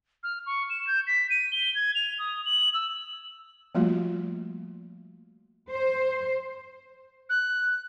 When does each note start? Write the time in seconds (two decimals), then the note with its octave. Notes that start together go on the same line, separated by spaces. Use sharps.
0.23 F6
0.46 C#6
0.70 E7
0.87 G6
1.07 B6
1.30 D#7
1.52 G7
1.75 G#6
1.95 F7
2.19 D#6
2.45 F#7
2.74 E6
3.75 F3 G3 A3 A#3 F4 F#4
5.70 C5
7.30 F#6